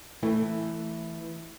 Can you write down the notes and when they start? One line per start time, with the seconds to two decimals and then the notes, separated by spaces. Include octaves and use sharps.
0.22 E3 A3 E4